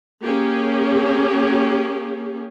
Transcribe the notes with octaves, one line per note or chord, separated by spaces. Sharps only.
A#3 C#4 G4 G#4